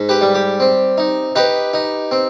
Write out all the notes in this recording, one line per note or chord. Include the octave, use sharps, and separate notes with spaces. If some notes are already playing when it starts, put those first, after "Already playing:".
Already playing: G#2
G4 B4
G3
G4
C4
D#4
D#4 G4 B4
D#4
C4